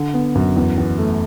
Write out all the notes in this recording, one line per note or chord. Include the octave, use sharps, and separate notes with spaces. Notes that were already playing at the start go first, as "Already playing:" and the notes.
Already playing: D3
B3
F#2
E2
E2
A3